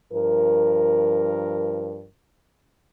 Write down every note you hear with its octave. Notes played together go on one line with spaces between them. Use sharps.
G2 F3 A#4